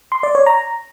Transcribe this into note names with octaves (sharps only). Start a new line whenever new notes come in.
C6
D5
C#5
A#5